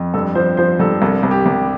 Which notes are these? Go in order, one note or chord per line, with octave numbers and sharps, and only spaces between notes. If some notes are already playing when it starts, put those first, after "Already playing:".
Already playing: F2
G2 A4
F3 C5
F3 C5
G2 A4
C2 A4
C2
G4
C2